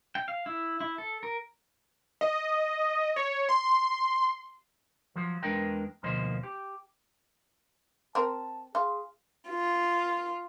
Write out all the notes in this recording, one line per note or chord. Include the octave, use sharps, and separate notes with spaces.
G5
F5
E4
E4
A4
A#4
D#5
C#5
C6
F3 F#3
E2 G#3 D4 A#4 B4 G5
D2 B2 F3 A#3 C5 D#5
G4
C4 A#4 A5
F4 G#4
F4